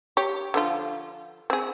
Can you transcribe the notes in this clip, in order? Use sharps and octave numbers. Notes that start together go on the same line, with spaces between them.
G4 C#5
D3 F3 F4
C4 G#4